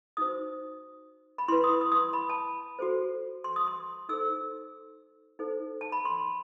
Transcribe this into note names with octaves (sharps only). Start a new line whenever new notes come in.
D#4 F#4 C5 D#6
B5
E4 B4 C6
D#6
C6
D#6
D#6
C6
B5
A5
F#4 A4 C5
C6
D#6
C6
D#4 A4 C5 E6
D#4 A4 C5
A5
B5
C6